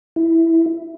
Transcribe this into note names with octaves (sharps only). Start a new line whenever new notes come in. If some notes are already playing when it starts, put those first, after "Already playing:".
E4